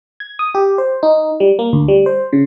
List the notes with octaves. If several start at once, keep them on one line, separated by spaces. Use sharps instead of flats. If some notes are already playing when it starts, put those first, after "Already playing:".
G#6
D#6
G4
C5
D#4
G3
A#3
D2
G3
C5
C#3